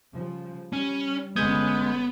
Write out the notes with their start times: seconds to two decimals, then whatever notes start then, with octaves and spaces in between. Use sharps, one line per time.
0.13 C#3 F3 G3
0.73 G3 C#4
1.36 G1 D3 G#3 B3 C#4 D#6 G6 G#6